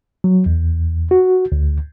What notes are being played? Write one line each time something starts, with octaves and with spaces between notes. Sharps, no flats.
F#3
E2
F#4
D2